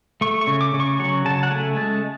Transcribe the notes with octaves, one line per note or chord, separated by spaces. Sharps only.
A3 C#6
C#6
C#3
D6
C#3
C#6
F#3 C#6
C#3 A5
F#5
A3 G#5
G#3 A5